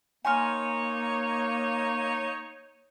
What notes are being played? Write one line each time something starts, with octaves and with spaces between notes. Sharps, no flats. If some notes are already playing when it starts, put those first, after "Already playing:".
A#3 D#4 C#5 G#5 C6 F6